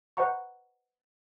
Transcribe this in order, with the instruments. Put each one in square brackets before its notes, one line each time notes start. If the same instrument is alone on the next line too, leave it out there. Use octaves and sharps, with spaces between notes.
[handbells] B4 C5 D#5 F#5 A#5 C#6